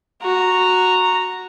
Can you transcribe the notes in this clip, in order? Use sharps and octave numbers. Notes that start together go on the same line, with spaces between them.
F#4 A#5